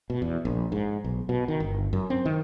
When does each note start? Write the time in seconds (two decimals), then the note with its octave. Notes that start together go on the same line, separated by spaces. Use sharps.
0.10 B2
0.22 E2
0.45 A#1
0.72 G#2
1.04 B1
1.29 B2
1.48 D#3
1.60 G1
1.93 F#2
2.10 C4
2.26 D#3